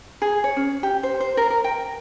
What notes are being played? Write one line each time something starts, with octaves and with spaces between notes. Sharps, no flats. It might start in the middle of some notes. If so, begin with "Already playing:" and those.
G#4
C#5
C#4
G4
C5
C5
A#4
A#4
G5